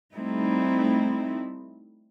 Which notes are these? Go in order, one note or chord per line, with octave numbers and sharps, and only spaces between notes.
G3 A3 C4 D#4 E4